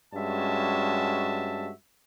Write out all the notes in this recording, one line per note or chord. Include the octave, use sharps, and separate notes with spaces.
G2 G#3 C#4 F#4 E5 A5